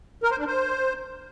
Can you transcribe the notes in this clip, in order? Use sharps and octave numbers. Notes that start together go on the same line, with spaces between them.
A#4
C5
D4
C5